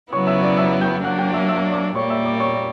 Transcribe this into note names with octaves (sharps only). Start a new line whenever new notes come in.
C#3 F#3 B3 E4 C#5 C#6
E5 E6
D5 D6
E5 E6
G5 G6
F#3 A#3 D4 F#5 F#6
G5 G6
E5 E6
E5 E6
D5 D6
A#2 G3 A#3 C#5 C#6
E5 E6
D5 D6
C#5 C#6